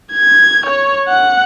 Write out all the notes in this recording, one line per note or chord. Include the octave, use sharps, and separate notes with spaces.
G#6
C#5
F#5